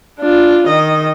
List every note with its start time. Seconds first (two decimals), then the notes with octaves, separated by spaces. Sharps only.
0.19 D4 F4
0.68 D#3 D#5